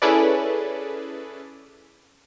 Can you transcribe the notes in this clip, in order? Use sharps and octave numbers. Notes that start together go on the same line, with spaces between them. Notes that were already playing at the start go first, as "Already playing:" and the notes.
C#4 E4 G#4 A4 B4 D5